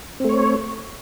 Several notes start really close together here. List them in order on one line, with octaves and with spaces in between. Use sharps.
C4 A3 C#5